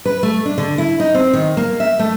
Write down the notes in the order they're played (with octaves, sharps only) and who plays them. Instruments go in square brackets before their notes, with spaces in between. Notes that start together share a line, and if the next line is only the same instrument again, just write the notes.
[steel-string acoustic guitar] B4
A3
D4
D3
E4
D#4
C4
D#3
A#3
E5
A3